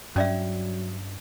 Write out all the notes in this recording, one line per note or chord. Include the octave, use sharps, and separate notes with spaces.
G2 F#3 C#4 D5 E5